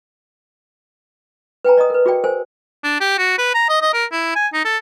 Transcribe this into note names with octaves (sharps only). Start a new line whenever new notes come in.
B4 G5 G#5 A#5
D5 D#5 A#5 D#6
A#4 B4
F#4 G#4 D5 G5
A#4 C5 G#5
D4
G4
F#4
B4
A#5
D#5
D#5
A#4
E4
G#5
D#4
A4